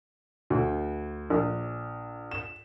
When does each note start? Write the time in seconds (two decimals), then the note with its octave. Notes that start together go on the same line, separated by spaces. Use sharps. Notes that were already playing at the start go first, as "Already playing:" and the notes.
0.50 D2
1.30 A#1
2.31 E7